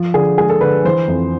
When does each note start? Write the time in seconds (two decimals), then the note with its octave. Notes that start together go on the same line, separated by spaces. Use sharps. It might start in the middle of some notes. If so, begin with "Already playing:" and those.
Already playing: F3
0.14 D3 G#4
0.38 G#3 G#4
0.50 A4
0.61 D3 B4
0.85 E3 C5
1.08 F2